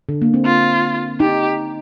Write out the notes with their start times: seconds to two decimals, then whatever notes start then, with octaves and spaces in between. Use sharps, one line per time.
0.09 D3
0.22 A#3
0.34 C4
0.45 F4
1.20 D#4 G4